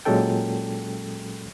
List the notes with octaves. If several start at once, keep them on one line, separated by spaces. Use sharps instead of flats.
A#2 F#3 G#3 C#4 A4 G5